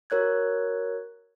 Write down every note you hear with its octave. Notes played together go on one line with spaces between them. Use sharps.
F#4 A#4 C#5 F#6 G#6